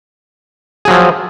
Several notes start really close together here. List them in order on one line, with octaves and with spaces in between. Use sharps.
G#4 F#3 F3